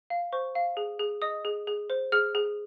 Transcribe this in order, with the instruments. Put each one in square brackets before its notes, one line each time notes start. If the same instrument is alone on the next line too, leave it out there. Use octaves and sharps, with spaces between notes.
[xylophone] F5
C5 C#6
F5
G#4
G#4
D#5 D#6
G#4
G#4
C5
G#4 F6
G#4